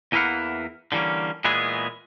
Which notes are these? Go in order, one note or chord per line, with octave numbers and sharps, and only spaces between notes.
E2 E3 A#3 E4 F5 F#5
D3 E3 G3 A#3 C#4
A#2 E3 G#3 B3 G#4